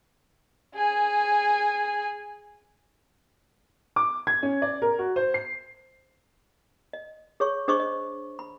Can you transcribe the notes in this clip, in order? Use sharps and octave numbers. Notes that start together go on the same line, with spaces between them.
G#4 G#5
D6
G#6
C#4
D5
A#4
F#4
C5
C7
D#5
G#4 C#5 C#6
D4 G#4 C5 D#5 C#6 D6
D#5
B5